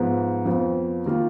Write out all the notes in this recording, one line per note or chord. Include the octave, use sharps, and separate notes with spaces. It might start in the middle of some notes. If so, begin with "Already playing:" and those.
Already playing: G#2 F3 B3
F2 F3 B3
D#3 A#3 F4